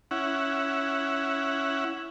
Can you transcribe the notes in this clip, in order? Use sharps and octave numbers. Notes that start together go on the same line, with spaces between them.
C#4 E4 F#5